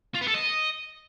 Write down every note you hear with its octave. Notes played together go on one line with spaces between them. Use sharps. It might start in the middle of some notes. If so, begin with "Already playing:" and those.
F4
B3
A4
D#5